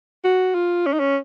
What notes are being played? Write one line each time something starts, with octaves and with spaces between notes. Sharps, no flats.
F#4
F4
C#4
D#4
C#4